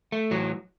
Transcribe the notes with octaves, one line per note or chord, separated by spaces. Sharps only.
A3
A2 E3 F#3